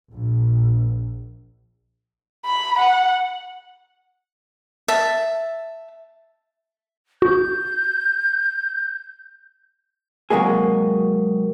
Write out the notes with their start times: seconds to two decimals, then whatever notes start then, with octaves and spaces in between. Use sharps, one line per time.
0.11 A#1
2.45 B5
2.79 F#5
4.88 E5 A5
7.22 F#4 G6
10.30 C3 F#3 G#3 A#3 G#4